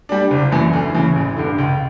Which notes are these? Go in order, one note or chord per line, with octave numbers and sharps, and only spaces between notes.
G3 D4
F#1
F#2 E3
D2
C#3 E3
A1
G2 D3
C#2